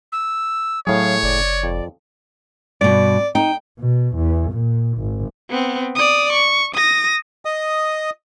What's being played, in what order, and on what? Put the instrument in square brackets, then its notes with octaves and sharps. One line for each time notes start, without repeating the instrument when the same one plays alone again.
[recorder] E6
[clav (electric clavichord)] A2 G#4 [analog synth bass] F#3 [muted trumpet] C#5 [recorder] F5
[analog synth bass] F#1 [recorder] D5
[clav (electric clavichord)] F2
[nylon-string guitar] G2 B2 [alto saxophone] D5
[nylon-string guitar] D#4 [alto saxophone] G5
[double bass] B2
E2
A#2
G#1
[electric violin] B3 C4
D5 D#6
C#6
D#6 A#6
[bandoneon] D#5 D#6